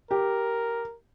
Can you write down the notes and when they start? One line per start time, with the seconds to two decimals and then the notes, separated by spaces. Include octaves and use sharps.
0.11 G4 A#4